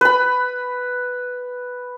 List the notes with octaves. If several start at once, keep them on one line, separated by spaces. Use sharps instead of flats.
B4 B5